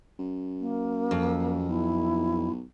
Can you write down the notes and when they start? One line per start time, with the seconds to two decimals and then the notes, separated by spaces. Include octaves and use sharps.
0.19 F#2
0.60 A#3
1.11 F2
1.69 B1 E4